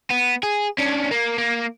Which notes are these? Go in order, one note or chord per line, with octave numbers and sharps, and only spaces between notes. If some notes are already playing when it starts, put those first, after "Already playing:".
B3
G#4
C#4 D4
A#3
A#3